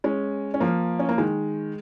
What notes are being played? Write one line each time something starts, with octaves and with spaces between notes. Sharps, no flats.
G#3 C#4
C#4
F3 A#3
C#4
A#3
D#3 G#3